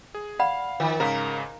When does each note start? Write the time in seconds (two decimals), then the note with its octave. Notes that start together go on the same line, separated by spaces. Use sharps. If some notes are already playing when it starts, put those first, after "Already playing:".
0.15 G#4
0.40 D5 F5 F#5 B5
0.80 D#3 F3
1.00 G#2 C#3 A#4 F5 A#5